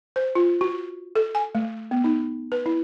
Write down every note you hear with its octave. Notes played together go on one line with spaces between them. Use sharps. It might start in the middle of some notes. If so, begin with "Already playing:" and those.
C5
F4
F#4
A4
G#5
A3
B3
D#4
B4
E4